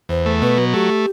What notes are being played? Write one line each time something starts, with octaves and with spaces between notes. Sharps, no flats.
E2 C5
A3
B2 B4
F#3
A3 G4